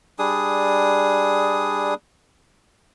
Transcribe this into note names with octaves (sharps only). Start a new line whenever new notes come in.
G3 D4 G#4 D#6